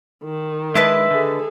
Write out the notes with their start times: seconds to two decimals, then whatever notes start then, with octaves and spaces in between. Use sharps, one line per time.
0.24 D#3
0.75 G#3 D4 E4 B4 D#5 E5 A5
1.11 D3 G#4 A4